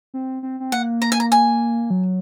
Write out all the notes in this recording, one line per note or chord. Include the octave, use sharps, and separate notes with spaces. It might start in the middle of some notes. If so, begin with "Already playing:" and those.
C4
C4
C4
A#3 F#5
A#5
G#5
A#5
G#5
F#3